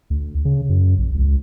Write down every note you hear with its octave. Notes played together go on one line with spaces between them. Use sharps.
D2
C#3
F#2
A#1
C#2